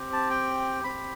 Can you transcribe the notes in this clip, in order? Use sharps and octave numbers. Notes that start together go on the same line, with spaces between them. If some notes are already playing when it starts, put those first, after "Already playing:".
Already playing: C4 G4
A5
G5
C4 G4 B5